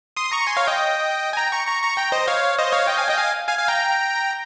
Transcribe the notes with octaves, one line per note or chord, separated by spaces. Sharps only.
C6 D#6
A#5 C#6
G#5 C6
C#5 F5
D#5 G5
G#5
G5 A#5
A#5 C#6
A#5 C#6
A#5 C#6
G5 A#5
C5 D#5
C#5 F5
C5 D#5
C#5 F5
D#5 G5
F5 G#5
D#5 G5
F5 G#5
F5 G#5
F5 G#5
G5 A#5